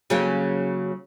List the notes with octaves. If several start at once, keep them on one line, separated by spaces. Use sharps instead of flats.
C#3 F#3 A#3